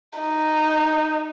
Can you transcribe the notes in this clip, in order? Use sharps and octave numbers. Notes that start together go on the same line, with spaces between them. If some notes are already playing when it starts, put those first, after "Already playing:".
D#4